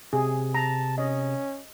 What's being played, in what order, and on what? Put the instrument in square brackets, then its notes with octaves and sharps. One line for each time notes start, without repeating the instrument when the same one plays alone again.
[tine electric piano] C3 [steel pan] G#4
[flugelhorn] A5 [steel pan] A#5
[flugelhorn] C#4 [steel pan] D#5